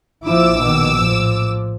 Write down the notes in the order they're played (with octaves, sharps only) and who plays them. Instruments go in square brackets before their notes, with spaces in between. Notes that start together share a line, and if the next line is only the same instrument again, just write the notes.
[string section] A#1 D6 E6 [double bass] F3 E4
[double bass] B2 D#3
A2 F3